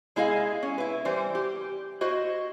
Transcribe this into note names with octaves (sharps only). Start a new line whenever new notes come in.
G#3 E4 G#4 D#5 F5
C#4
E4 B4
E3 G3 C5
G4
E4 F#4 C5 D#5